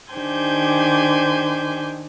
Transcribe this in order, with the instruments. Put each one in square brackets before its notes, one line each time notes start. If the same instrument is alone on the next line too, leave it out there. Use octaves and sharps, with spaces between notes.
[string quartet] D#3 D4 G4 C5 G#5 G6